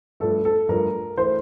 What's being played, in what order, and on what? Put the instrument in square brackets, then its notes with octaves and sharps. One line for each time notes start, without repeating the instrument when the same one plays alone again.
[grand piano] G2 F3 A3 [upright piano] A4
[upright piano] A4
[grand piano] G2 F3 A3 [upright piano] A#4
[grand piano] E3 A3 E4 A#4 [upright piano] C5